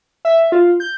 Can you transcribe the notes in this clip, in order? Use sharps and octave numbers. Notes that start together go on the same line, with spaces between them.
E5
F4
G6